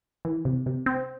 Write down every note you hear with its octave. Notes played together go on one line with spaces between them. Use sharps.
E3
C3
C3
C4